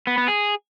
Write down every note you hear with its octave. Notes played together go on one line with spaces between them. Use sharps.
B3
B3
G#4